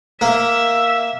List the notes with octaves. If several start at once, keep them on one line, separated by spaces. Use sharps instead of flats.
A#3 E5